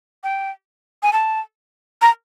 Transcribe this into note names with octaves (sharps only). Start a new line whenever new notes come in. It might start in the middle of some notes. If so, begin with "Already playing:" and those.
G5
G#5
A5
A#5